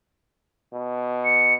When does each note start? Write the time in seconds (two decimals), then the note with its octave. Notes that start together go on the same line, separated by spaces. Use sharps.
0.73 B2
1.25 C#7